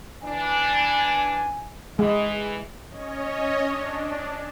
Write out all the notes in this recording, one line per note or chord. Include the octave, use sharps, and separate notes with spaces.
E3 D4 G#5
E3 G#3 G#4
C#4 C#5 D#5
D4